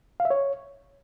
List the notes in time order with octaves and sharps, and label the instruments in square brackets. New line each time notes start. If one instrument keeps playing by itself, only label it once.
[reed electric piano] F5
E5
C#5